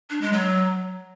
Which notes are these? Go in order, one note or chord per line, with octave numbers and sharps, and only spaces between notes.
D4
G#3
F#3